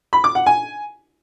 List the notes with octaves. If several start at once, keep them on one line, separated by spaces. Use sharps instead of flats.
B5
D6
F#5
G#5